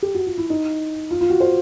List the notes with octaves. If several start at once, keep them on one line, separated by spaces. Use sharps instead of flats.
G4
F#4
F4
E4
D#4
F4
F4
F#4
C5